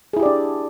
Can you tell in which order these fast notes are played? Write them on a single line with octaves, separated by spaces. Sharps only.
G#4 E4 G4 D5 D4